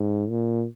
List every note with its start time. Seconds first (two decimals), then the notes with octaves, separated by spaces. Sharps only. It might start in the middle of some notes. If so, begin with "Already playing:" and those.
Already playing: G#2
0.29 A#2